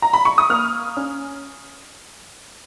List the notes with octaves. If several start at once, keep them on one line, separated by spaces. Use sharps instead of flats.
A#5
B5
C#6
D#6
A#3 F6
C#4